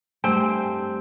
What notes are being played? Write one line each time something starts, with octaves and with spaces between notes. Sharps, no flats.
G2 G3 A3 C4 G#5